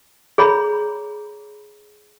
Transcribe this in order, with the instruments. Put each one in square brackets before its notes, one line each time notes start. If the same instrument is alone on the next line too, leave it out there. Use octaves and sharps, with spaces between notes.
[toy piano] G#4 C#5 A#5 B5